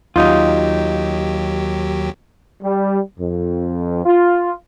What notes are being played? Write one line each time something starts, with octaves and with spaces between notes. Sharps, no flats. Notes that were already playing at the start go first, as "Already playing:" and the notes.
D#2 F#3 D#4 F4 G4
G3
F2
F4